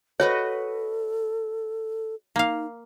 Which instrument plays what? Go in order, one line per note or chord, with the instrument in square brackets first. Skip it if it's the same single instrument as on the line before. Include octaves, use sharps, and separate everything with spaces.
[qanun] F#4 B4 D#5 [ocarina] A4 [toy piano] C#5
[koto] A#3 F5 [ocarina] D#4